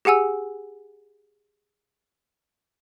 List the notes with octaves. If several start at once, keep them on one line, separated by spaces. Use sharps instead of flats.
G4 G#4 F#5 G#5 E6